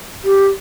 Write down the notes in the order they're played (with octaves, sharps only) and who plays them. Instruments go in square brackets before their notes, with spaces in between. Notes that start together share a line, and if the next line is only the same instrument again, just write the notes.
[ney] G4